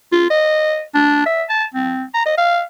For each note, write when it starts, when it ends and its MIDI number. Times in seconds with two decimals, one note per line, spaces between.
0.12 0.26 65
0.30 0.82 75
0.94 1.24 62
1.26 1.43 76
1.49 1.65 81
1.74 2.03 60
2.14 2.25 82
2.26 2.34 75
2.37 2.61 77